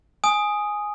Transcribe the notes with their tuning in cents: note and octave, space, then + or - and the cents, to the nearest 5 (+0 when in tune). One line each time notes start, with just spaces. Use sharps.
G#5 +0 D#6 +0